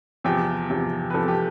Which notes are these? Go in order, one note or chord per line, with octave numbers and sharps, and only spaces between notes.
E2 C3 F3 G5
E2 C3 F3
B4
E2 C3 F3 A4
G4